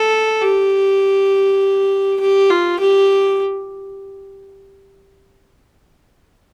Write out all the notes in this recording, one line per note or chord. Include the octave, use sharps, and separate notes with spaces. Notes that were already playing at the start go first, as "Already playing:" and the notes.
Already playing: A4
G4
G4
F4
G4